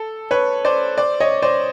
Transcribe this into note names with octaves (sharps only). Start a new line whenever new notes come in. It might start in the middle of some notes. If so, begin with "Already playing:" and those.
Already playing: A4
B4 C#5
C5 D5
C5 D5
C#5 D#5
C5 D5